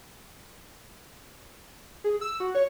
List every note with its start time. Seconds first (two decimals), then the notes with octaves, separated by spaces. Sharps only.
2.04 G#4
2.21 E6
2.40 F#4
2.55 C#5